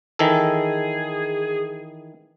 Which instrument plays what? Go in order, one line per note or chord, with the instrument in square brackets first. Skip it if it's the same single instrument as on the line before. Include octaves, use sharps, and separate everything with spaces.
[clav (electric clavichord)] D#3 E3 A4 [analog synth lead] G#4